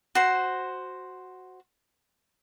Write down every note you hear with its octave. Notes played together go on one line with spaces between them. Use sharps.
F#4 C5